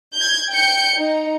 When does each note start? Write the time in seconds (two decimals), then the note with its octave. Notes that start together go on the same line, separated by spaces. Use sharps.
0.16 G6 G#6
0.51 G5 G6 C#7
0.99 D#4